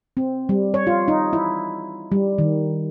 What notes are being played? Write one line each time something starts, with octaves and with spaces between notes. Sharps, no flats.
C4
G3
C#5
F4
D#4
E4
G3
D#3